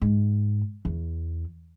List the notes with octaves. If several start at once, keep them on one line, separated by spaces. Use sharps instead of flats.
G#2
E2